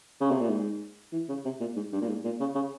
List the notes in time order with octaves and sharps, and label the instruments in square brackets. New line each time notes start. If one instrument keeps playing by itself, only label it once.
[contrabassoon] C#3
C3
A#2
G#2
E3
C#3
C3
A#2
G#2
G2
A#2
G#2
A#2
C#3
C#3